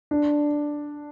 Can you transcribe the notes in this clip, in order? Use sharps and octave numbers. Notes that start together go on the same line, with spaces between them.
D4